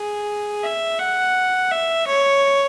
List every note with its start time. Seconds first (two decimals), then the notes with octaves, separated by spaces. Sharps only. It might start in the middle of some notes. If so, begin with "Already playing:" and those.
Already playing: G#4
0.63 E5
0.99 F#5
1.71 E5
2.07 C#5